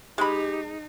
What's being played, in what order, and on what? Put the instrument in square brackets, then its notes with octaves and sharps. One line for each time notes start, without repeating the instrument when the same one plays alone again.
[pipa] G#3 B5 [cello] D#4 [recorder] G4